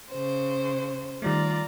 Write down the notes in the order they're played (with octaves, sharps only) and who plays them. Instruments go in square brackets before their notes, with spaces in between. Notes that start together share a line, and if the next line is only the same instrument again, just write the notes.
[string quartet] C#3 C5
[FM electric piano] D#3 G3 A3 [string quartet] F4 D5 A#5